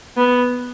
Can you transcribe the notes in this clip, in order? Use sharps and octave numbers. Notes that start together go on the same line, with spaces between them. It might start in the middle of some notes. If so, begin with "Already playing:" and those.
B3